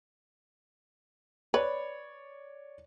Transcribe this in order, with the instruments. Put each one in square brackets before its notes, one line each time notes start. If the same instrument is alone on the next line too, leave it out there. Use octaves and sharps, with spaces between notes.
[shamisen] B4 [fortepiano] C#5 D5